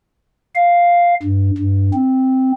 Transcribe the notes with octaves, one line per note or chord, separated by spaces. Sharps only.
F5
G2
G2
C4